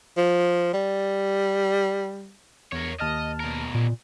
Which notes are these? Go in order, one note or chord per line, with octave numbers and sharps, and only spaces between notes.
F3
G3
E2 A#4 C#5
D#2 D#5 A5 F6
B2 A#4
A#2